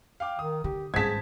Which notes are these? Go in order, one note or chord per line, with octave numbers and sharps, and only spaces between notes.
F5 G5 D6
D#3 D#6
D3 G4
G#1 G2 G#4 C5 A5 G#6 B6